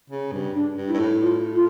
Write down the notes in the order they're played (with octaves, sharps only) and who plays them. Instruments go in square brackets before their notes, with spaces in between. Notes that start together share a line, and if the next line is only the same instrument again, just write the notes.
[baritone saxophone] C#3
G2
[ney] D4
[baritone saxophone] G2
[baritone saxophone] G2 [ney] E4
[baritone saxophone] A2
[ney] F4
F4